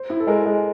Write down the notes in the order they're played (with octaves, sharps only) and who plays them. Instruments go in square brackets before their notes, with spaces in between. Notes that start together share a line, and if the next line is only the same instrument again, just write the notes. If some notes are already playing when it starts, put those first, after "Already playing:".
Already playing: [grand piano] C5
[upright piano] E4
[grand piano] A4
[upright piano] G#3 [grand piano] A#4
[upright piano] G#3